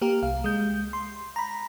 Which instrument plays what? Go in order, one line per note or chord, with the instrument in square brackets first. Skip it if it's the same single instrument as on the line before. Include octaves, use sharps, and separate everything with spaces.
[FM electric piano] A#3 G4 A#4
C2 F5
G#3 G6
C6
A#5 B5